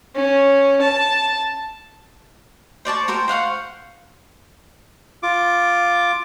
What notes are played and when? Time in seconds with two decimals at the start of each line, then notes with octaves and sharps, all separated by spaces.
0.15 C#4
0.81 A5
2.85 C5 D5 A5 C#6
3.08 F#4 A#4 C5 G5
3.28 C5 F5 F#5 C#6
5.23 F4 D6